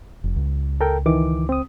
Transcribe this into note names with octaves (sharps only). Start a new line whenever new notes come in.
F1
C#2
A4 A#4 G5
D#3 E3 D6
C4 D#6